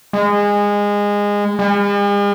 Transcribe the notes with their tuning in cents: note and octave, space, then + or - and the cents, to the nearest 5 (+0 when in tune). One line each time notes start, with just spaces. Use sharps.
G#3 -20
G#3 -45